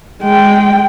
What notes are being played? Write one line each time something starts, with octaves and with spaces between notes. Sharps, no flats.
G#3 G5